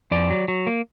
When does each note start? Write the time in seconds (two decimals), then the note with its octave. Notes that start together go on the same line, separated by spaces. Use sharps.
0.11 F2 D5
0.30 F#3
0.48 F#3
0.67 A#3